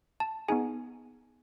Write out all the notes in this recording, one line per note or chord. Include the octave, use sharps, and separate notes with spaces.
A5
B3 D#4 G#4 G#5